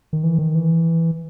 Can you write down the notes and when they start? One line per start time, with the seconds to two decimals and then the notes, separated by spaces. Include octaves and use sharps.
0.13 D#3
0.24 E3
0.39 D#3
0.55 E3